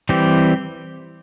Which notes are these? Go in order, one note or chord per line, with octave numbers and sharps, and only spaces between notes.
E3 G3 C4 G4